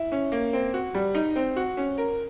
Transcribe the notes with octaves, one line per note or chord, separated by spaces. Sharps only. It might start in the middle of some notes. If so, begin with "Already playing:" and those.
Already playing: E4
C#4
A#3
C4
F#4
G3
D#4
C4
F#4
C#4
A#4